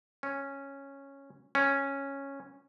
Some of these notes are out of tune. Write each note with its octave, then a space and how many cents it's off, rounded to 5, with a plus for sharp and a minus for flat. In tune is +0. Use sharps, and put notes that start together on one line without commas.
C#4 -5
C#4 -5